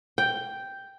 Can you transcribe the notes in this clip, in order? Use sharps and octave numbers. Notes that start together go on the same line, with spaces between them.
G5